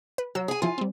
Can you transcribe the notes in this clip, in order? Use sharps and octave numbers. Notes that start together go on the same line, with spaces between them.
B4
F#3 F#4 E6
G#4 G#5
F3 E4 F4 G#4 G#5
G3 C4